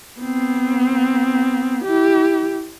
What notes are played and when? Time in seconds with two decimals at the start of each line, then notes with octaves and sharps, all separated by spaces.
0.20 B3 C4
1.85 E4 G4